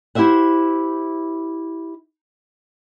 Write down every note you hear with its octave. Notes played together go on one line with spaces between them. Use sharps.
E4 G4 C5 E5 F#5